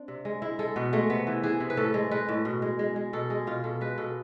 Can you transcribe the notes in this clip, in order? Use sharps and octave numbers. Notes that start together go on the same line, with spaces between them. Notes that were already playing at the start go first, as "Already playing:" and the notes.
Already playing: C4 D4
C3
G#3
G#3 E4
G#3 A4
B2 B3
G#3 A3
C3 B3
E3
E3 G#4
C3
B4
A2 A4
G#3
G#3 B4
A2
B2
G#3
G#3
G#3
B2 A4
G#3 G#4
B2 F4
B2 A4
G#3 B4
B2 A4